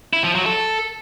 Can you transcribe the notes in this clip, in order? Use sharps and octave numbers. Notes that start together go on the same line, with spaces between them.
E4
F3
F#3
A4